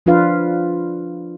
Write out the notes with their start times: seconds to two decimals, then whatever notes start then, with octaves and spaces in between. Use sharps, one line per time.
0.06 F3 D4 F4 B4 F5